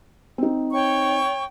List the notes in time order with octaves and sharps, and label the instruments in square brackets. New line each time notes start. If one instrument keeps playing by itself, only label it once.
[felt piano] C4 D#4
[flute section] C#5 G5 C#6